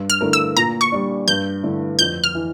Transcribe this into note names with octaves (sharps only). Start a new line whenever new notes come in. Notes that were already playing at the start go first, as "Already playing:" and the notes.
Already playing: G2
F6
D3 A3 E4 A#4
E6
A#2 A#5
C#6
G3 D4
G2 G6
D3 A3 E4
F2 G6
F6
E3